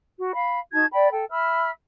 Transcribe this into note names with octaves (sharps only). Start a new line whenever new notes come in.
F#4
F5 B5
D#4 F#4 A5 G#6
D5 G5 B5
A4 G5
E5 B5 E6 F6